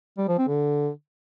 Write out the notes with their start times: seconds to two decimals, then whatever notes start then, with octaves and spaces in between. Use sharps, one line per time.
0.18 G3
0.28 F3
0.38 C4
0.48 D3